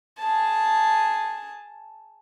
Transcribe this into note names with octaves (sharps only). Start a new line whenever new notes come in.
G#4 A5